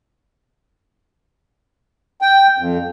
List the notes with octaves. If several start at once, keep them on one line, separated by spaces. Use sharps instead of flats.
G5
F2